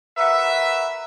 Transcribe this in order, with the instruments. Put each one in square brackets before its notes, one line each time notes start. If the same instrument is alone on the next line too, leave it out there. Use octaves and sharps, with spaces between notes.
[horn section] F#4 A#4 B4 E5